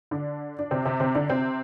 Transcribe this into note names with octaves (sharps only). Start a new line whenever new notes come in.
D3 D4
D4
C3 C4
C3 C4
C3 C4
D3 D4
C3 C4